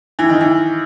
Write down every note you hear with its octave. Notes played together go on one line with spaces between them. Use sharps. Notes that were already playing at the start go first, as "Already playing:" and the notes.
E3
D#3
E3